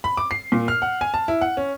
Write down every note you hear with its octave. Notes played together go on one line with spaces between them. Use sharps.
B5
D6
C7
A#2
F6
F#5
G#5
A5
E4
F#5
C#4